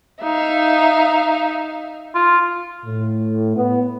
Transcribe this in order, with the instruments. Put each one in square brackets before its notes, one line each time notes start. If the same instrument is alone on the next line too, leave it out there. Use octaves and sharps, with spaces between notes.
[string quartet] D#4 E5 F5
[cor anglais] F4
[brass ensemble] A2
B3